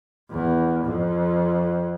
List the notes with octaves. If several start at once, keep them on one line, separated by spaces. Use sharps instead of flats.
E2
F2